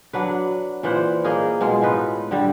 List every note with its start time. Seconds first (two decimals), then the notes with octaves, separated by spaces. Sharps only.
0.13 F#3 D4 B4
0.83 A#2 E3 C5 F#5
1.24 A#3 D#4 G#4 A#4
1.60 B2 G#3 F4
1.82 A2 G#3 D#4 B4
2.31 D3 G3